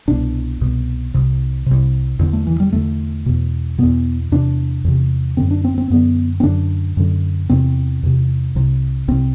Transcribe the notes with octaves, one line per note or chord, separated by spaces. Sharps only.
C2 B2 D4
C2 B2
C2 C3
C2 C3
E2 D3
A3
E3
G3
E2 D3 A3
E2 B2
E2 B2 B3
E2 C3 D4
E2 C3
F#2 D3 C4
D4
C4
C4
F#2 D3 B3
C4
F#2 D3 D4
F#2 D3
E2 C3 C4
E2 C3
C2 C3
C2 C3 C4